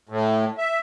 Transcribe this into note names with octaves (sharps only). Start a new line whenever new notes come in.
A2
E5